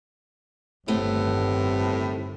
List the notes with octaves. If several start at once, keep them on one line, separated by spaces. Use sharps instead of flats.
G1 A2 C3 D#3 A3 B3 C4